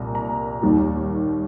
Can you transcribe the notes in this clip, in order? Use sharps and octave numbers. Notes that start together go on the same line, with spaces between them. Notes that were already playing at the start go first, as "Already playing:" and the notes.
Already playing: C2 A#2 A#5
A#5
D#2 D#3 G3